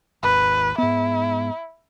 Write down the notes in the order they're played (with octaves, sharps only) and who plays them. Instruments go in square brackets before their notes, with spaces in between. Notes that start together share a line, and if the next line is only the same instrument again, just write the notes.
[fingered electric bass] G#1 D#2 [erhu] B4
[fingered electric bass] G#2 B3 [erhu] E4